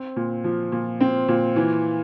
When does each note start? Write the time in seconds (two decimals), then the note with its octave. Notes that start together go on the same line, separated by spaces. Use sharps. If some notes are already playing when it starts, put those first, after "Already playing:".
Already playing: C4
0.16 A#2
0.44 F3
0.72 A#2
1.00 C4
1.28 A#2
1.56 E3